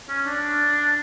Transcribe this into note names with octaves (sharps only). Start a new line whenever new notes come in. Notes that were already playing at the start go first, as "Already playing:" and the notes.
C#4
D4